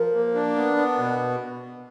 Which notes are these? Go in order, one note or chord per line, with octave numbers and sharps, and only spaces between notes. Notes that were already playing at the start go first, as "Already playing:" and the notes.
Already playing: F3 A#4
A#3
D4
B3
B3
B2